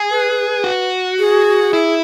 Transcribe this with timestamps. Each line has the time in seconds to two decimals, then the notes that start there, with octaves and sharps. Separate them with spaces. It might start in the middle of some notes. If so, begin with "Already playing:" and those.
Already playing: G#4
0.11 B4
0.64 F#4
1.19 G#4
1.73 E4